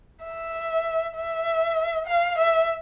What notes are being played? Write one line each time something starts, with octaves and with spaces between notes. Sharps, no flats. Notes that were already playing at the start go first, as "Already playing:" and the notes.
E5
E5
F5
E5